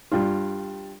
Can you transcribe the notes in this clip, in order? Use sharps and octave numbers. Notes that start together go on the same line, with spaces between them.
G2 G3 F4